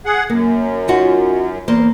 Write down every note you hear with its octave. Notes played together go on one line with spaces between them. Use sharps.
G#4 F#5
F#2 A#3
D#4 F4 F#4
E2 A#3 C5